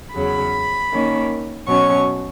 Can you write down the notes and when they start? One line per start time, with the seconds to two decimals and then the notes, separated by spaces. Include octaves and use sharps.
0.15 E2 C#3 F#3 B5
0.91 D#3 A#3 C#4
1.67 B2 F#3 C#4 C#6